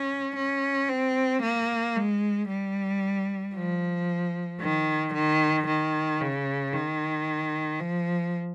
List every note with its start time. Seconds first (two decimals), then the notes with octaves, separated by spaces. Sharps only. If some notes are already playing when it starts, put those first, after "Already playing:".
Already playing: C#4
0.36 C#4
0.89 C4
1.42 A#3
1.96 G#3
2.49 G3
3.55 F3
4.60 D#3
5.14 D#3
5.67 D#3
6.21 C#3
6.73 D#3
7.80 F3